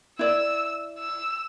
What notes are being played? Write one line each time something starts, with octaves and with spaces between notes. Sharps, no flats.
E4 D5 E6
E6